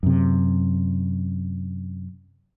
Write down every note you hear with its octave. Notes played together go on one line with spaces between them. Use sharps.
F#2 C3